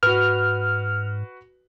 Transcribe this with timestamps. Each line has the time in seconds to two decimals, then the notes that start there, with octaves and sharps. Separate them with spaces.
0.03 G#2 F#4 B4 F6